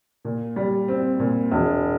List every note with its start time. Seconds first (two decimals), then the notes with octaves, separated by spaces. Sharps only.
0.25 A#2
0.56 G3
0.88 C4
1.19 A#2
1.51 E1